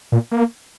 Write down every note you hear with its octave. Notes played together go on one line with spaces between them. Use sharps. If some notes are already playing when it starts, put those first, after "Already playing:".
A#2
A#3